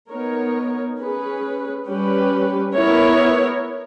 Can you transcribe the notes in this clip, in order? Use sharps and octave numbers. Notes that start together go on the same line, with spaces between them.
B3 D#4 A#4 C#5
C#4 G#4 B4
G3 C#4 G4 B4
B3 E4 A#4 C#5